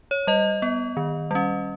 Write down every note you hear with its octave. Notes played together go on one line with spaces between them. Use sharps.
C#5
G3 D#5
B3
D#3
G3 C#4